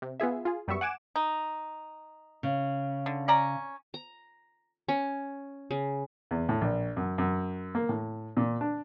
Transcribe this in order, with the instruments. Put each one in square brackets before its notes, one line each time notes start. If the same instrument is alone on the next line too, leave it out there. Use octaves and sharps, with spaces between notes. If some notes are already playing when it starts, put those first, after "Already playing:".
[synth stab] C3
B3 F4 G#4 E5
F4 G#4
F#2 G3 B3 E5 C#6
F#5 G#5 D6 E7
[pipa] D#4
[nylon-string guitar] C#3
[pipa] D3
C#4 D5 A#5
[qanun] A#5
C#4
C#3
[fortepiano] E2
A2
A#1
F#2
F#2
A#3
A2
A#2
D4